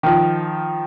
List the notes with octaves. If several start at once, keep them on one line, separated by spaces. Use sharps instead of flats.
D#3 F3